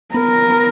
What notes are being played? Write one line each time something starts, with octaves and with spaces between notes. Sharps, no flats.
B3 A#4
B3